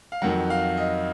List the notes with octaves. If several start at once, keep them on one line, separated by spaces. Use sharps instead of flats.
F5
F2 D#3 F#3 F#5
F5
D#5